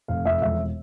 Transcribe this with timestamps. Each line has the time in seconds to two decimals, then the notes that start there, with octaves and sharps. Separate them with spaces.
0.08 F1 F5
0.25 F2 E5
0.42 E1 E5